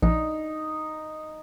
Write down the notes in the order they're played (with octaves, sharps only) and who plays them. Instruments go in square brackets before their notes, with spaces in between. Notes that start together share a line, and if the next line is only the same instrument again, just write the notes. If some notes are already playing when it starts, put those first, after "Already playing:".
[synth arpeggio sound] A#1 [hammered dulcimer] D#4